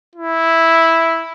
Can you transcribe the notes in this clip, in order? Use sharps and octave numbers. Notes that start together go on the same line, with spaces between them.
E4